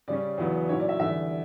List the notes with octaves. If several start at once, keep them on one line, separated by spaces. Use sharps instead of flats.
C#3 G3 C#4 D5
E2 C#3 F#3 B3 E4
A#2 F#3 C#4 E4 C#5
D5
E5
E2 D3 G3 E5